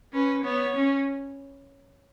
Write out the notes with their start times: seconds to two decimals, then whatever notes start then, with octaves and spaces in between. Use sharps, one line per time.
0.13 C#4 B4
0.44 B3 C#5
0.76 C#4